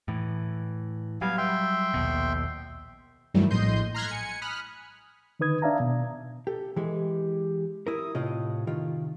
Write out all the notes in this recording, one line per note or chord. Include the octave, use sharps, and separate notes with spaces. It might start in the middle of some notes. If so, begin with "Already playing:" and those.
A2 E3
F#3 G3 B3 F5 G#5
E5 G5 C6
A#1 D#2 B2
G2 D#3 E3 F#3 G3 A3
A#1 A2 D#5 C6 G6
A#5 C6 F6 F#6 G#6 B6
G#5 C#7
B5 D#6 F6 F#6
D3 D#3 D#4 B4 D#6 G#6
D4 D5 E5 F5 A5 A#5
B2
G4 A4
E3 G#3 G4
E4 A#4 D#6
A2 C3 F4 D#5
D#3 F4